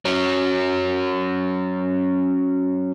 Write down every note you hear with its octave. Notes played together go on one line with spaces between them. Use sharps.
F#3 C#4